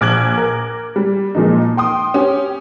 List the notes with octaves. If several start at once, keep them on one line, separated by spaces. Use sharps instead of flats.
A#1 D6 F#6 G#6 F#7
A#4
G3
A#2 F3 G#3 D#4
G5 C6 D#6
C#4 G4